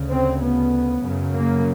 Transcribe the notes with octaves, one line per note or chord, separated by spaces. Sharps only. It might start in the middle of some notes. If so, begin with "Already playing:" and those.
Already playing: D2 C#3
C4
B3
F#2 C#3
A#3